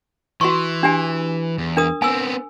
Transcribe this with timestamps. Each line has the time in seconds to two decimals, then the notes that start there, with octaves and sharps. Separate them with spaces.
0.41 E3 F#4 C6 C#6
0.83 D4 G4 G#5
1.58 E2
1.77 D4 A#4 D#6
2.02 B3 C4 G#5 E6